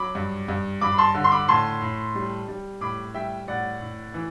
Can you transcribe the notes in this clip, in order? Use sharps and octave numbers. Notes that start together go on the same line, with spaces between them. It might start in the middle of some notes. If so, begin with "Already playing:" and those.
Already playing: F#3 B5 D6
G2
G2
G2 B5 D6
B5
A5 C6
D3
C6
B5 D6
A2 A5 C6
A2
G3
G3
A2 B5 D6
G3 E5 G5
A2 D5 F#5
A2
E3